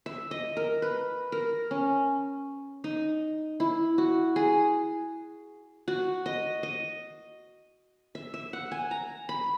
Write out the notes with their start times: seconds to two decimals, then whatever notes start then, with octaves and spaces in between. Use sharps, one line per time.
0.06 E5
0.31 D#5
0.57 A#4
0.82 B4
1.32 A#4
1.71 C#4
2.84 D#4
3.60 E4
3.98 F#4
4.36 G#4
5.88 F#4
6.26 D#5
6.63 D#5
8.15 E5
8.34 E5
8.53 F#5
8.72 G#5
8.91 A#5
9.29 B5